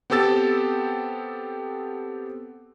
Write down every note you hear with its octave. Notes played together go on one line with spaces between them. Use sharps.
B3 C4 G4 A4 E6 A6